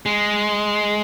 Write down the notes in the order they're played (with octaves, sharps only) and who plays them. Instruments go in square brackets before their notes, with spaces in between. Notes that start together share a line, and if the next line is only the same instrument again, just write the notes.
[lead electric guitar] G#3